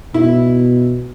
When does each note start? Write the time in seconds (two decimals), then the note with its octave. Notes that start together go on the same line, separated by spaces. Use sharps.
0.14 B2 E4